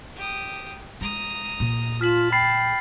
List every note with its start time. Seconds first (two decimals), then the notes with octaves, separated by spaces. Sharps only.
0.16 G4 D#6
1.01 G#3 A#5 D#6
1.60 A#2
2.01 F4 A5 F6 B6 F#7
2.32 G5 B5 A6 C7